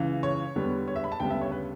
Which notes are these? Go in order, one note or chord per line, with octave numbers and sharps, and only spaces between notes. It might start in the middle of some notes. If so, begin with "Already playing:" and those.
Already playing: C#2 C#3 E3
C#5
E2 D3 G3 B3
C#5
E5
B5
A5
D2 C#3 G3 B3 G5
E5
C#5
B4